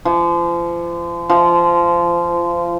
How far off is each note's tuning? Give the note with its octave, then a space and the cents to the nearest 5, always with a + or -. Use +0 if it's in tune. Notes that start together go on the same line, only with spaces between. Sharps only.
F3 -35
F3 -20